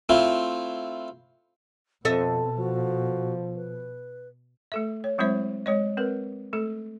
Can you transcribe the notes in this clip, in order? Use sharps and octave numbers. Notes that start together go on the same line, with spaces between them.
A3 C4 E4 F4
F2 B2 C4 A4 D#5 E5
F3 F#4
B4
A3 A4 E5
C#5
F#3 G#3 C4 E4 C5 E5
G#3 C#5 D#5
C4 A#4 B4
A3 A4